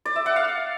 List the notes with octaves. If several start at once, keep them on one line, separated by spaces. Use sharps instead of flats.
D5
E5
F#5
F5